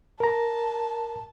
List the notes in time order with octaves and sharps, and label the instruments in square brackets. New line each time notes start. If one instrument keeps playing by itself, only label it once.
[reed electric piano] A#4 A#5 [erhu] A5